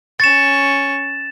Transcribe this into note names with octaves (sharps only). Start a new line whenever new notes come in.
C#4 C#6 A6 E7